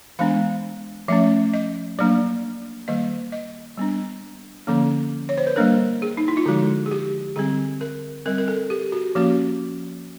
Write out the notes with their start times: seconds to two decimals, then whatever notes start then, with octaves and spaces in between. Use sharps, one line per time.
0.19 E3 G#3 B3 D4 F5
1.08 F3 A3 C#4 E5
1.54 D#5
1.99 F#3 A#3 D4 D5
2.88 D#3 G3 A#3 D#5
3.32 D#5
3.77 G3 B3 D4
4.67 D3 F3 A#3 C#4
5.29 C#5
5.38 C5
5.47 B4
5.56 G3 A#3 D4 A#4
6.02 G#4
6.17 D#4
6.28 E4
6.37 F4
6.46 D3 F3 G#3 F#4
6.86 G#4
6.91 G4
7.36 D3 G3 C4 G#4
7.81 A#4
8.26 G3 C4 A#4
8.38 A#4
8.48 A4
8.70 G4
8.92 F#4
9.15 F3 A#3 C#4 F#4